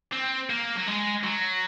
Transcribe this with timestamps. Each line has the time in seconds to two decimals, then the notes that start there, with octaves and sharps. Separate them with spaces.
0.13 C4
0.49 A#3
0.75 F#3
0.86 G#3
1.24 F#3